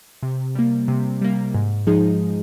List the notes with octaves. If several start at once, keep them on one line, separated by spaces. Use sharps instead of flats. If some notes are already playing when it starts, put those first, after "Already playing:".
C3
G3 A#3
C3
G3 A#3
G#2
F3 G#3 D#4 G#4